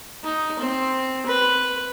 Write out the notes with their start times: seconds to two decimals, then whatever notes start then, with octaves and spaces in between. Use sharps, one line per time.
0.23 D#4
0.59 C4
1.26 B4